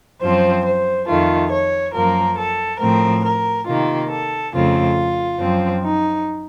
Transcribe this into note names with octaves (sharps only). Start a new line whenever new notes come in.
F#2 F3 C4 C5
C5
F2 D#3 A3 F4
C#5
F#2 F3 A#3 A#4
A4
A2 F3 A3 C4 A#4
A#4
C3 D#3 A#3 F4
A4
F2 C#3 A3 C4 F4
F#2 F3 C4
D#4